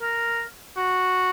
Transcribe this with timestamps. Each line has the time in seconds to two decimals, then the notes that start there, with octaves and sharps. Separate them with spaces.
0.02 A#4
0.77 F#4